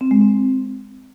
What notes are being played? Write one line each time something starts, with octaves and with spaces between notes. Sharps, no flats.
C4
G#3
C4